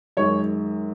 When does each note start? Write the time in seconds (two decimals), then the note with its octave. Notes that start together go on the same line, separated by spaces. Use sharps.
0.17 F#2 D#3 G#3 C#5